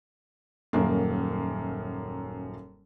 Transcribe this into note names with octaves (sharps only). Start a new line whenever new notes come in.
D#1 F#2 A#3